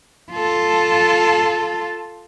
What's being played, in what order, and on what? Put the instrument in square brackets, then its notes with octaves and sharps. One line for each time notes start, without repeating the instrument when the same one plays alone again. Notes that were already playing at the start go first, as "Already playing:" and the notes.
[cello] F4 A4